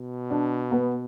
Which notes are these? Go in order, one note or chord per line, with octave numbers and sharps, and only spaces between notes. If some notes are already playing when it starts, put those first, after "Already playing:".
Already playing: B2
D4
B3